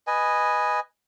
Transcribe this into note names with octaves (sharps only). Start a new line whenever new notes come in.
B4 D#5 G#5